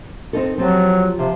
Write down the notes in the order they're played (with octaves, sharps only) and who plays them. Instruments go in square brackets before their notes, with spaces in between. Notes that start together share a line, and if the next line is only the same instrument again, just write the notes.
[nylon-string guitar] C4 D#4 A4
[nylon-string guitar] F3 C4 G4 [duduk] F#3
[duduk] C3 [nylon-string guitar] F3